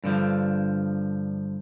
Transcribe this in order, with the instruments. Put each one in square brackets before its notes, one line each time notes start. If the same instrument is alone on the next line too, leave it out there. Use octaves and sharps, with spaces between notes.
[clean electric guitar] G2 D3 F3